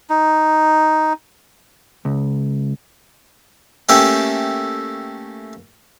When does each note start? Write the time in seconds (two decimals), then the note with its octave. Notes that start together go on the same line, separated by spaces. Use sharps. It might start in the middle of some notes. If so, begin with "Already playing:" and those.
0.10 D#4
2.05 C#2
3.89 A3 A#3 C#4 G4 E5 G5